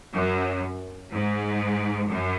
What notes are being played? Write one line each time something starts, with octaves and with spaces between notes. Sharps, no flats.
F#2
G#2
F#2